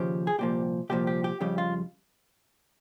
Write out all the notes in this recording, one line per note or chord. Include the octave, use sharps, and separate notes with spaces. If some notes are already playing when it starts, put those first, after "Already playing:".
Already playing: D#2 C#3 F3 G4
G#4
C2 A#2 F3 G4
C2 A#2 F3 G4
G4
G4
F2 C#3 G3 G4
F4